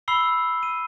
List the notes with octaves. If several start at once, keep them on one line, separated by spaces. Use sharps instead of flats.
B5 E6 C7 G7
D#7